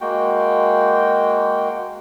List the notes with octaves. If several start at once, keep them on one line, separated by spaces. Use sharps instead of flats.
G#3 A#3 F#4 G5